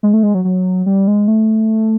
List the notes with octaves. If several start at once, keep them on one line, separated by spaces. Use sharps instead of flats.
G#3
A3
G#3
F#3
F#3
G3
G#3
A3